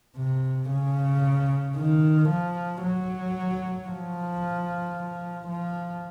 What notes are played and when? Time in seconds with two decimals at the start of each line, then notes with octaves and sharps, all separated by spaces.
0.17 C3
0.70 C#3
1.76 D#3
2.29 F3
2.83 F#3
3.88 F3
5.48 F3